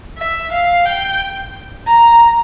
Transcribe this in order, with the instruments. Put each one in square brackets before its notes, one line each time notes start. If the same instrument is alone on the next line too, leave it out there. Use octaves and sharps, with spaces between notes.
[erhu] E5
F5
G5
A#5